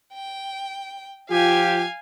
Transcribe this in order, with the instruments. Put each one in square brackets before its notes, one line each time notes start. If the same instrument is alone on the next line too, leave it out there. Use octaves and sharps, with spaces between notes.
[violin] G5
[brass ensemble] F3 F4 G4 [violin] F5 G#5